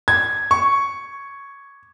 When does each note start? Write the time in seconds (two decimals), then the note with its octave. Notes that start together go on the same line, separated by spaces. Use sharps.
0.08 G#6
0.51 C#6